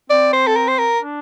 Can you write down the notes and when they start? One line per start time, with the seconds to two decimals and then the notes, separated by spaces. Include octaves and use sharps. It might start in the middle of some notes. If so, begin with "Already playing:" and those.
0.10 C4 D5
0.33 C5
0.47 A4
0.56 A#4
0.68 C5
0.79 A#4
1.02 D4